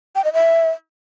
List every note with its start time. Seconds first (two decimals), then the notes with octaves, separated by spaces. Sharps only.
0.15 G5
0.24 D#5
0.33 E5